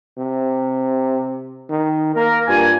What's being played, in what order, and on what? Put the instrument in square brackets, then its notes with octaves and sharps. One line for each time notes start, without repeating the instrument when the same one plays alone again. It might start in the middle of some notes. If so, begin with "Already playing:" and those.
[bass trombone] C3
D#3
[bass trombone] A#3 [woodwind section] A#4
[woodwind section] G2 F4 G#5